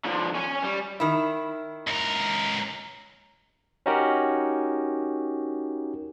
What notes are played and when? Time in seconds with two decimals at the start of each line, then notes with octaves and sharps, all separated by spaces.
0.05 D3 F3
0.35 C#4 G#5
0.63 G3
1.00 D#3 E4
1.87 C#2 A#4
3.86 C#4 D#4 F#4 G4 A#4